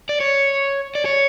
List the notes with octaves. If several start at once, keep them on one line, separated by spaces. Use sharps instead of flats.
D5
C#5
D5
C#5